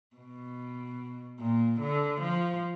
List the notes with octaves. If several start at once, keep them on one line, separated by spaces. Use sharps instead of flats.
B2
A#2
D3
F3